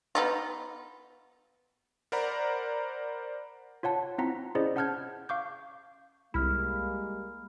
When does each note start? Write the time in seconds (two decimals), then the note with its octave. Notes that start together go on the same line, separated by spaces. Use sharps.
0.15 B3 D#4 F4
2.12 A#4 C5 D5 F#5 A#5 B5
3.83 F4 C#5 F#5 A5
4.18 C4 E4 F4 F#5 A#5 B6
4.55 C#4 E4 G#4 C5 D5 D#5
4.76 C#4 F#5 A5 F6 G6 G#6
5.29 F5 C#6 D6 G6
6.34 C2 G3 G#3 A#3 E4 B5 F6